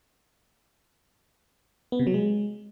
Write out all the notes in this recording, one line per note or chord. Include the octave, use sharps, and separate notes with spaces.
B3
C3
F#3
G#3